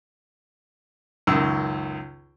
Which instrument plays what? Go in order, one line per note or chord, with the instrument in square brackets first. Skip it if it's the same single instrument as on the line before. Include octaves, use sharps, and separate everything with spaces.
[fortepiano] C#2 F#2 D#3 E6